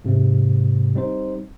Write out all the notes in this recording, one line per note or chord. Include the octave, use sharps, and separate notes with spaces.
G#2 C3 G#3 C4
G3 C4 D#4 C5